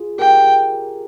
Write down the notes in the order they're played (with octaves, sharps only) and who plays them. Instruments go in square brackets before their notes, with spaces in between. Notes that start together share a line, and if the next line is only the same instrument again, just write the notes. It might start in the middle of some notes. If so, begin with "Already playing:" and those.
Already playing: [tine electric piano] F4 G#4
[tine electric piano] G4 A#4 [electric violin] G5